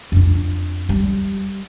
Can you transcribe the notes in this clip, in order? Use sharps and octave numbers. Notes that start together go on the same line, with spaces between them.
F2 D4
G3